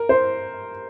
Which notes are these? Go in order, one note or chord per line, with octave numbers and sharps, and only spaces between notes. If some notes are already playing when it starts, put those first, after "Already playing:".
Already playing: A#4
C5